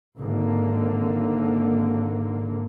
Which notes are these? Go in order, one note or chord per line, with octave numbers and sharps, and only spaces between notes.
G#1 D3 A#3